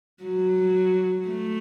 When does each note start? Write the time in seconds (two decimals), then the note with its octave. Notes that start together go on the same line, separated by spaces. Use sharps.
0.23 F#3
1.29 A3